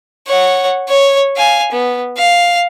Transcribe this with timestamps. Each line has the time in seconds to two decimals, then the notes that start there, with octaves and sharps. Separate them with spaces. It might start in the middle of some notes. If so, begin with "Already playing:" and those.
0.28 C#5 F#5
0.89 C#5
1.36 F5 G#5
1.72 B3
2.17 F5